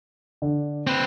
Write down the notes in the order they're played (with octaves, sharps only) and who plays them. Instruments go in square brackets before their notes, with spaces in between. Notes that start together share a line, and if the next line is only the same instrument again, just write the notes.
[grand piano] D3
[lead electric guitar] C4 B4